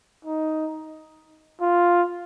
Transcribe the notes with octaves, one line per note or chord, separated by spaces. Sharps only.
D#4
F4